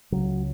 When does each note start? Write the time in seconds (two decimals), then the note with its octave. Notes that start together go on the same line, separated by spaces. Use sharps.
0.12 C#2 C#3 F#3